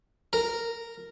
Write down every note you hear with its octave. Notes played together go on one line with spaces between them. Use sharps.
A#4